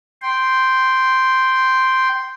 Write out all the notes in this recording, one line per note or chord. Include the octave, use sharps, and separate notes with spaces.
G5 C6